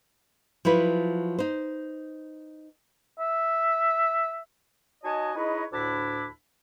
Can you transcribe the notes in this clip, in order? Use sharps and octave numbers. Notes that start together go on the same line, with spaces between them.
F3 F#3 E4 B4
D#4 C5
E5
D#4 F#4 C#5 D#5 G#5 A5
D#4 E4 G#4 B4 C#5 D#5
D2 A2 D4 E4 B5 D6